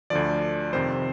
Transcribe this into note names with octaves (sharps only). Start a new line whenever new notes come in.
D2 D3 F3 D5
F2 C3 D#3 C5